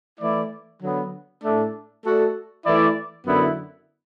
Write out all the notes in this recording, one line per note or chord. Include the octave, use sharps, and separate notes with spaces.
E3 A3 E4 D5
D3 F#3 B3
A2 A3 D4
A3 F#4 A4 D5
E3 A3 E4 D5
F#2 D3 B3 E4